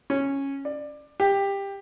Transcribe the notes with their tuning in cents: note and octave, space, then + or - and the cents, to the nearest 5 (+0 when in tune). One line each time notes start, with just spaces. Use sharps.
C#4 -10
D5 +20
G4 +15